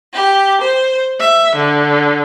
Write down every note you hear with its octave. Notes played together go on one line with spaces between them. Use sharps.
G4
C5
E5
D3